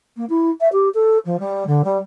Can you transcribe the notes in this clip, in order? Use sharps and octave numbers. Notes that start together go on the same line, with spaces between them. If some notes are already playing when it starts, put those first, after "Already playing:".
A#3
E4
E5
G4
A4
F3
G3
D3
G3